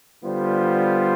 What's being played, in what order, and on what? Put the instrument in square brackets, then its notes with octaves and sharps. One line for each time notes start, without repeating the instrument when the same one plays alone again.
[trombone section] D3 G3 B3 F4 C5